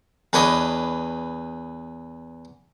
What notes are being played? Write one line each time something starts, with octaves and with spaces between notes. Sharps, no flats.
E2 D4 B4 C#5 D#5